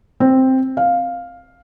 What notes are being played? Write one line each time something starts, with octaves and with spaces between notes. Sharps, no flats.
C4
F5